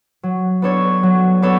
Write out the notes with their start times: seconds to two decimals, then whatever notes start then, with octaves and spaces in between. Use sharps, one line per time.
0.23 F#3
0.62 B3 D4 A4 C#5
1.03 F#3
1.42 B3 D4 A4 C#5